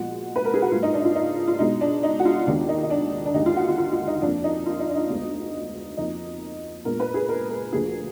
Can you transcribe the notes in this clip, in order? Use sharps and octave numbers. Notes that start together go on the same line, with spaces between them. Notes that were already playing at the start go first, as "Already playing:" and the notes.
Already playing: A#2 F3 G#3 B3 F#4
B4
A#4
G#4
F#4
G#2 F#3 A#3 F4
D#4
D4
D#4
F4
D#4
F4
B2 G#3 B3 D#4
D4
D#4
F#4
F4
D#2 D#3 G#3 B3 D4
D#4
D#4
D4
D4
D#2 D3 G#3 D#4
F4
F#4
F4
F4
F4
D#4
F2 F3 A#3 D4
D#4
F4
D#4
D4
D#4
D2 D3 G#3 B3
F2 F3 A#3 D#4
A#2 G#3 B3 A#4
B4
G#4
A#4
A#4
D2 D3 F3 A#3 G#4